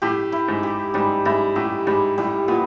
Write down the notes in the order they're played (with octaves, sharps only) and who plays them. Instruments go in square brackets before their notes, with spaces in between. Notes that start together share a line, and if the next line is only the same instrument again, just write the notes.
[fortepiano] A2 [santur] G4
[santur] E4
[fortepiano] G#2
[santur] G4
[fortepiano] G#2 [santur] G3
[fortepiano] G#2 [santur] E4
[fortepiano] A2 [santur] G4
[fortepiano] G#2 [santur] G3
[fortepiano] A2 [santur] G3
[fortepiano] A#2 [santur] B3